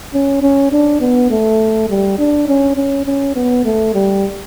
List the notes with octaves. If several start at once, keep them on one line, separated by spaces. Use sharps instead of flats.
C#4
C#4
D4
B3
A3
G3
D4
C#4
C#4
C#4
B3
A3
G3